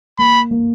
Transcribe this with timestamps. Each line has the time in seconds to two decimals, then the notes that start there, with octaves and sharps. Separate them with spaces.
0.18 A#3 B5
0.51 A#3